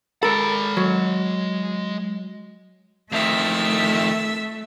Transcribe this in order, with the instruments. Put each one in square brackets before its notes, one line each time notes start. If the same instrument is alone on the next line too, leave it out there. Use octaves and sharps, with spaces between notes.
[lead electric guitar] G#3 B5 [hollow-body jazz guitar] A4 A#4
[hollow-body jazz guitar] F#3
[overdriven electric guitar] F2 D#3 [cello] A3 [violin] E5